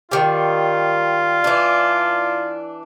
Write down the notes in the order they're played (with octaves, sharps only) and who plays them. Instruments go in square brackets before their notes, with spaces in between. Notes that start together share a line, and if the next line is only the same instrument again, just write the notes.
[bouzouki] D#3 G3 [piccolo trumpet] F4
[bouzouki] E3 D4